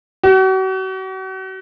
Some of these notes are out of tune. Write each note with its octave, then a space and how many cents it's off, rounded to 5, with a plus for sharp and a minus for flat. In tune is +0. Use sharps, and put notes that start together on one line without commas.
F#4 +40